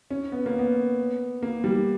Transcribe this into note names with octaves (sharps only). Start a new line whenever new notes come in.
C#4
B3
A#3
B3
A#3
G3